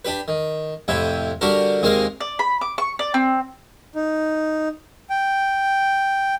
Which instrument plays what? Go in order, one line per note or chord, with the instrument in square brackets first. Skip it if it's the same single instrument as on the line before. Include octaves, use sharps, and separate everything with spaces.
[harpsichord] D4 G4 B4
D#3
F2 A2 C3 E4 G5
D3 G3 D4 F#4 G4 A#4
D#2 C3 G#3 A#3 A#4 F5
[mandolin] D5
B5
D6
C#6
D5
C4
[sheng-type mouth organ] D#4
G5